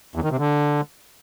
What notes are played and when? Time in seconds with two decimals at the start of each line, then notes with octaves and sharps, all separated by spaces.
0.15 E2
0.23 D#3
0.31 C3
0.39 D3